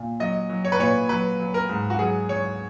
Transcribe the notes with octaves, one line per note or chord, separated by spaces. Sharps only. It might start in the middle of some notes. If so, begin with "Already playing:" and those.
Already playing: A#2
F#3 D#5
F#3
C#5
B4
A#2 C#5
F#3 B4
F#3
A#4
G#2
F#4
F#3 G#4
F#3 C#5